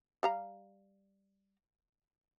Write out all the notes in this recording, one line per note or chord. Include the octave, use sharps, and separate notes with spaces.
G3 F5 A#5